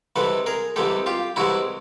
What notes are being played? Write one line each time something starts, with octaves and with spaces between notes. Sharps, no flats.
C2 C3 E3 G#3 A4 B4
G#4 A#4
C2 C3 E3 G#3 G4 A4
F4 G4
C2 C3 E3 G#3 E4 F#4